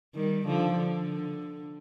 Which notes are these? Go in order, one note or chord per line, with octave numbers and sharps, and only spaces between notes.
D#3 G3
D3 F3
D3